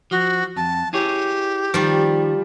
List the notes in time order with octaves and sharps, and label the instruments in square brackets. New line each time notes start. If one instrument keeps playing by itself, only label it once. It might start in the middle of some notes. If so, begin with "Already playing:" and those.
[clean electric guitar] F3 [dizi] F#4
[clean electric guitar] F2 [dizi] A5
[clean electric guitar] E4 G#4 C#5 [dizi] G4
[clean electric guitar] D#3 [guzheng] F3 G3